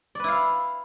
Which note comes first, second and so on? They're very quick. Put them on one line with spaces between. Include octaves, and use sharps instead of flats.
D5 B4 E4 F5